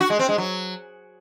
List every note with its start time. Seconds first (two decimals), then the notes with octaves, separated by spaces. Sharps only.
0.01 F#4
0.10 G#3
0.19 C4
0.29 G#3
0.38 F#3